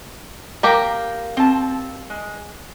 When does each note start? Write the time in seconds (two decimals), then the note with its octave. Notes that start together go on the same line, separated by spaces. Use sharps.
0.63 A#3 G4 A#4
1.37 C4 A5
2.10 G#3